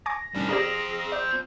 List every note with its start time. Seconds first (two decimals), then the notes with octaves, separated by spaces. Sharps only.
0.06 G#5 C#6 D6 A#6
0.35 A2 D#3 G3 C#4 D4
0.49 C4 F4 G4 G#4 D5 A#5
1.12 D5 G6